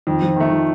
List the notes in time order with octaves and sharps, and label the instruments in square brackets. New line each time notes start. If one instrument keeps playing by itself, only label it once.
[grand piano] F2 [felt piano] D#3
[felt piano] F3
[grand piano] D#3 A3
[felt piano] D#3